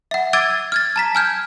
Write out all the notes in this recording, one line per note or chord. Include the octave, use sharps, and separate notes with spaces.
E5 F#5
D6 E6 G#6 A6 D7 D#7
F6 G#6 A6
A5 A#5 B6
G#5 F6 G6 G#6